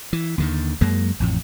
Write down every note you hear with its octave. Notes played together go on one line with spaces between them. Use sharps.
E3
D#2 D3 D#3
F#2 F#3 G#3 A#3
A1 F2 A2